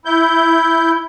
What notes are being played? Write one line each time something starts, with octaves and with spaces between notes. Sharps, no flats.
E4 G6